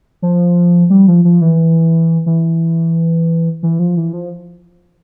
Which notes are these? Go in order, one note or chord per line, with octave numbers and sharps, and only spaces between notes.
F3
G3
F3
F3
E3
E3
E3
F3
E3
F3